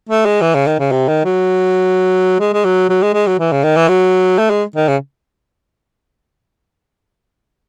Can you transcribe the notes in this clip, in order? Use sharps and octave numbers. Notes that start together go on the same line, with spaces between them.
A3
G#3
E3
C#3
D#3
C#3
C3
D#3
F#3
G#3
G#3
F#3
F#3
G#3
G#3
F#3
E3
C#3
D#3
E3
F#3
A3
G#3
D#3
C#3